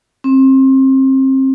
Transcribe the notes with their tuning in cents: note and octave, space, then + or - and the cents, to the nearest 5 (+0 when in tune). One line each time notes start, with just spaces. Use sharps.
C4 +30